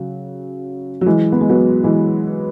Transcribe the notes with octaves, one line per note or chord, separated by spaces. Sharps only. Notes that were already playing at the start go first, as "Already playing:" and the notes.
Already playing: C#3 F#3
F#3
E3 G#3
B3
G#3
F#3 B3
E3 G#3